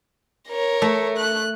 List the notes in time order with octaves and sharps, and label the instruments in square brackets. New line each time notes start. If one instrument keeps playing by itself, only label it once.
[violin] A#4 C#5
[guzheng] A3
[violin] F#6